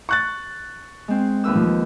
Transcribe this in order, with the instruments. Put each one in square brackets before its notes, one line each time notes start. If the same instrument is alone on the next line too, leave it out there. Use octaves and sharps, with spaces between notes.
[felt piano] C#6 F#6 A6
[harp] G#3 C4
D#2 B4 E6
[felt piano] F3